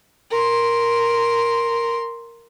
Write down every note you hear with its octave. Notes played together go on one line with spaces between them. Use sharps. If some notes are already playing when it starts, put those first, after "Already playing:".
A#4 C6